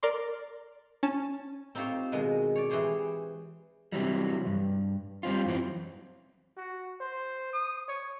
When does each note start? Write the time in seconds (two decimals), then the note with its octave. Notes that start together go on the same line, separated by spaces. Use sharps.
0.03 A#4 D5 C6
1.03 C#4 A5
1.75 C4 D#4 F4 G4 C5 C#5
2.12 B2 D#3 G#3
2.55 C#5 D5
2.70 E3 G4 G#4 C5 C#5
3.92 C3 E3 F#3 G3
4.47 G2
5.23 G3 C4 F4
5.46 F#2 E3 C4
6.57 F#4
7.01 C5
7.53 D#6
7.88 C#5